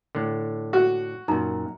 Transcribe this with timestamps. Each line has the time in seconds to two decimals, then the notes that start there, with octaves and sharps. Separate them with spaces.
0.15 A2 D3
0.73 F#4
1.28 F#2 A#2 D#4 A#5